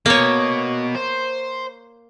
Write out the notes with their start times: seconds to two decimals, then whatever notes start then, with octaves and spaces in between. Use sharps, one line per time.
0.06 B2 A#3 C#5
0.95 C5